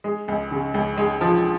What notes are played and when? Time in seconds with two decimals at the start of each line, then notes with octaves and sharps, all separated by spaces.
0.04 G#3
0.28 C#2
0.51 C#3
0.74 C#2
0.97 G#3
1.21 F3